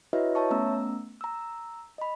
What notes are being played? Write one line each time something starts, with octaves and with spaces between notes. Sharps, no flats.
E4 F#4 B4 C#5 D#5 E5
C#5 E5 A5 C#6
A3 B3 C#4 A#5 E6
A#5 E6
D#5 B5